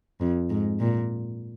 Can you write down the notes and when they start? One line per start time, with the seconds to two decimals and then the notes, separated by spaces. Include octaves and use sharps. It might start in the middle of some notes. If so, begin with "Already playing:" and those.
0.21 F2
0.50 G#2
0.80 A#2